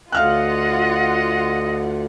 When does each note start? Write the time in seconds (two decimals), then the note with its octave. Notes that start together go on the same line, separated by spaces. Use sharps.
0.12 D2 F4 D#5 F5 F#5 F6 F#6